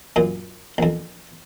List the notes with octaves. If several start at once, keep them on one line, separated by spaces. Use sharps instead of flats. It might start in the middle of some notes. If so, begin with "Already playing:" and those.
F#2 A#2
A#1 F2